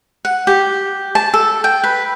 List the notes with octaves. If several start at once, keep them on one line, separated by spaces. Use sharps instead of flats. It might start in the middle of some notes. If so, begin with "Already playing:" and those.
F#5
G4
A5
A4
G5
B4